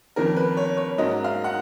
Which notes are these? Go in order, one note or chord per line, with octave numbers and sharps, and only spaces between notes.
F2 D#3 A#3 C#4 A#4
B4
C#5
C#5
G#2 F#3 A#3 C#4 D#5
F5
F#5